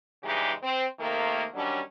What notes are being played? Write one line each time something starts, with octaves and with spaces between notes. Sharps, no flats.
G2 C#3 E3 G#3 D#4 G4
C4
C3 D#3 A3 A#3
D#3 F#3 G3 C#4 D4